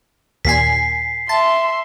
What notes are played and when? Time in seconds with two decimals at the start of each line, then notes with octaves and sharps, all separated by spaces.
0.45 D#2 A#2 G#5 B6 C7
1.29 E5 A5 C6